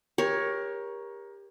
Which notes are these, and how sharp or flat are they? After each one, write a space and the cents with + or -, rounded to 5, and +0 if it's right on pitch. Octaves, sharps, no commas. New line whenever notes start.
G4 +25 A#4 +20 C#5 +0